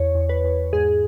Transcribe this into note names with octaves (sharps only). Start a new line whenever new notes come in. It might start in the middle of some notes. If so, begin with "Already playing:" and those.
Already playing: E2 C#5
E2
B4
E2
G#2 G#4